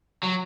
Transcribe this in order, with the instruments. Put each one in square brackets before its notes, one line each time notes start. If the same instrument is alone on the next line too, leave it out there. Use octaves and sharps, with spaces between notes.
[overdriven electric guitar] F#3